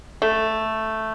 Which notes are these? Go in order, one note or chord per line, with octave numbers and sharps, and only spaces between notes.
A3